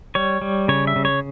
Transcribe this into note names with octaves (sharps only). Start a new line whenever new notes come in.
G3 C#5
G3
C#3 C#5
E5
C#3
C#5